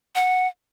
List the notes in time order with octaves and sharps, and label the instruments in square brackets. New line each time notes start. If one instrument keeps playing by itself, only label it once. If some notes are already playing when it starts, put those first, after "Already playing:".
[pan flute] F#5